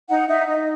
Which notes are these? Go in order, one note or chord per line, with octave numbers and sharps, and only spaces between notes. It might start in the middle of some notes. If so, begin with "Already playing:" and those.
D#4 F#5
D#4 E5
D#4 D#5